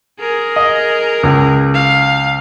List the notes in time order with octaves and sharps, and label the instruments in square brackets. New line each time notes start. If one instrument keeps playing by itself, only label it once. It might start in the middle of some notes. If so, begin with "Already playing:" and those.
[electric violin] G#4 A#4
[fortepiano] D#5
C#2
[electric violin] F5